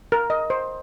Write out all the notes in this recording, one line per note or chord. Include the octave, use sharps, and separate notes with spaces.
A#4
D#5
C5